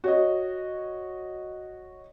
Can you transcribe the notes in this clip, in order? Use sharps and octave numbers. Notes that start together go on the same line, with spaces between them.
F#4 C#5 D#5